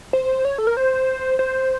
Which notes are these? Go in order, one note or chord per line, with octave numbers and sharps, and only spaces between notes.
C5
C#5
A4
A#4
C5
C5